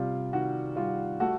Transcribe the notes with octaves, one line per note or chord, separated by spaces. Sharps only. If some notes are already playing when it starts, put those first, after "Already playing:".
Already playing: C3 G3 F4
D#3 F#4
G3 F4
A3 F#4